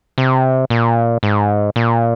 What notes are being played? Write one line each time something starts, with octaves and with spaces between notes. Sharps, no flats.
C3
A#2
G#2
A#2